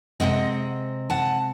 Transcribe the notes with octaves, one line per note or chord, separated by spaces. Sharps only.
C3 D#3 G#3 C4 D#5 F#5
F#5 A5